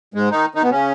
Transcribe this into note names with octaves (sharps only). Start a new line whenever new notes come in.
G#2 G#3
D#3 D#4
D#3 D#4
B2 B3
C#3 C#4